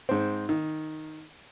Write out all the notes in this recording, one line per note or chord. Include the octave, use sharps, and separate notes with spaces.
G#2 C4
D#3